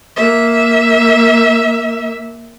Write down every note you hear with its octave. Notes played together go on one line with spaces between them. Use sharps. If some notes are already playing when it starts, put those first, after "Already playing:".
A#3 E5